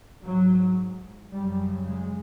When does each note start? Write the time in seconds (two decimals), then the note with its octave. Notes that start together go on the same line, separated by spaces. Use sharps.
0.23 G#2 F#3
1.33 F#2 C#3 G3
1.87 G#3